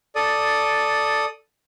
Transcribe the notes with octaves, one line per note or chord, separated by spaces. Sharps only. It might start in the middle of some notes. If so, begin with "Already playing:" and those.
A4 D5 D#6